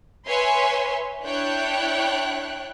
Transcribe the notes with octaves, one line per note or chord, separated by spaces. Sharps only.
B4 C#5 E5 G#5 C6
D4 E4 C#5 G5 F#6